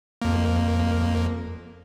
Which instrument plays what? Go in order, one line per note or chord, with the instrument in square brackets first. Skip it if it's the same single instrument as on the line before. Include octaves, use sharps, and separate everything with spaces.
[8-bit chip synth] F2 A#3